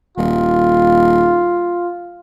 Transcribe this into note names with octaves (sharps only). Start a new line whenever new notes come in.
D#1 F4